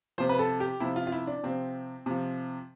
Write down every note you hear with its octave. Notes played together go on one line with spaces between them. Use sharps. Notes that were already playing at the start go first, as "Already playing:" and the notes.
C3 F3 C5
B4
A4
G4
C3 F3 E4
F4
F4
E4
D4
C3 F3 C4
C3 F3